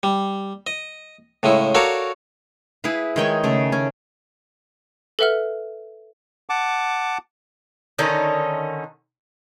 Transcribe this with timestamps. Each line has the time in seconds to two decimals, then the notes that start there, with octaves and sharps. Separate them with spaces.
0.03 G3
0.67 D#5
1.43 A2 C#3 G#3 E4
1.75 F#4 A4 A#4 C#5 D5 F5
2.84 E4 G#4 B4 F5
3.16 D#3 G#3 D#4 C#5 G5 G#5
3.44 C#3 A3
3.72 C#4
5.19 A4 B4 E5 F#5 F6
6.50 F#5 A5 D6
7.99 D3 D#3 C#4 D#4